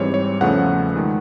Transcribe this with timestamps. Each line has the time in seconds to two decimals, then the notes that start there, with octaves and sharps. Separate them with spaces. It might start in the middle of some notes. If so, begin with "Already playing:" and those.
Already playing: G#2 E3 G3 C4 C#5
0.14 C#5
0.41 E2 C#3 F3 A3 F#5
0.96 D#3 G#3